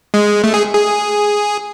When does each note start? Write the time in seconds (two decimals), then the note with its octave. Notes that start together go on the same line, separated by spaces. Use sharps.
0.14 G#3
0.44 A3
0.54 G#4
0.74 G#4